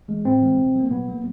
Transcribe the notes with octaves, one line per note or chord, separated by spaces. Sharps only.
E3 G#3
A2 C4
E3 G#3
B2
F#3 A#3
B2 B3
F#3 A#3